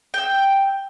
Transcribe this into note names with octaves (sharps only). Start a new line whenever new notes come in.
G5 E6